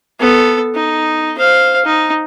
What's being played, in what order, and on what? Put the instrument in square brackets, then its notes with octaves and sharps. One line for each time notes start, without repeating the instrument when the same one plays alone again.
[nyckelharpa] B3 A4
D#4
C5 F5
D#4